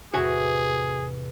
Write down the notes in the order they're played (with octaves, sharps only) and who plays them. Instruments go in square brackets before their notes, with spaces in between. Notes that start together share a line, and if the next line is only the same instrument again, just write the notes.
[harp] E2 A2 C3 [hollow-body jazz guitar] F#4 E5 G#5 [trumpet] G#4